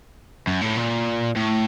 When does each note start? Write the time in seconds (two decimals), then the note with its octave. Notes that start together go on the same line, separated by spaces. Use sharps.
0.47 F#2
0.62 A2
0.77 A#2
1.36 A2